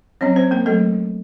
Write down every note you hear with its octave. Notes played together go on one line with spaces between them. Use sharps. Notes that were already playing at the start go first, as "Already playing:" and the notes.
F#3 C4 C#4 C#5
C4 C5
A#3 A#4
F#3 A3 A4